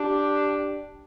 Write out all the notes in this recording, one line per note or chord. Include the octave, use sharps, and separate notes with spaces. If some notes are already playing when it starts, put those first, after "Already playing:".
Already playing: D4 G4